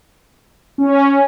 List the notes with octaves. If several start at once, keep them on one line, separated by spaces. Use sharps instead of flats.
C#4